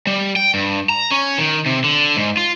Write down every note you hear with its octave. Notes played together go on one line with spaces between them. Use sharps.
G3
G5
G2
A#5
C#4
D#3
C3
D3
G#2
F4